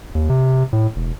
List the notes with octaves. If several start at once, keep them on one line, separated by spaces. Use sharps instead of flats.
D#2
C3
A2
E1